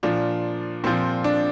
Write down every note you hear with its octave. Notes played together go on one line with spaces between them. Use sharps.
A#2 F3 D4
A#2 F3 C4
D4